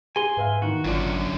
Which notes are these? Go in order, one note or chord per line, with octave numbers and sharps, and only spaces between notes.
G#4 G#5 C6
G#2 B4 E5 F5
D#3 E3 F#4
G#1 F#2 D3 F4 D5